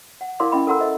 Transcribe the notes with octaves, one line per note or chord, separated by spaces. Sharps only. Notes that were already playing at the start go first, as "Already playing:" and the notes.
F#5
E4 A#4 D5 F5 C6 D6
C#4 E4 D#5 G5 B5
A4 A#4 F#5 A#5 C6 E6
A4 C5 D#5 E5